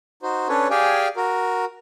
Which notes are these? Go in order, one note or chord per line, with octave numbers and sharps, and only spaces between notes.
D#4 F#4 C5
C#4 D4 A4 B4 C#5
G4 G#4 D5 F5 G5 G#5
F#4 A#4